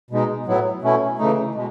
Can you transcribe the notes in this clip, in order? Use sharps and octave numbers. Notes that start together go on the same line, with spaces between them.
B2 G#3 D#4
A2 F#3 B3 E4
B2 A3 C#4 E4
C#3 E3 A3 D#4
B2 G#3